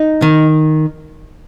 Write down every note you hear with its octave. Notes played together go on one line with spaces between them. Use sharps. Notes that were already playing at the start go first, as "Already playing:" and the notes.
Already playing: D#4
D#3